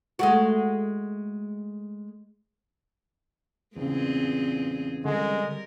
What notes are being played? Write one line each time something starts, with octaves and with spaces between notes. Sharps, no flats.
G#3 A3 F#4
E2 A#2 C#3 C4 G#4
D3 G3 G#3 A#4